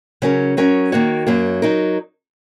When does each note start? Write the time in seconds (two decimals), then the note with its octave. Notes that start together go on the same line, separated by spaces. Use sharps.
0.22 C#3 F#3 C#4 A#4
0.57 F#3 C#4 A#4 C#5
0.92 D#3 A#3 F#4 C#5
1.27 F#2 F#3 A#3
1.62 F#3 D#4 A#4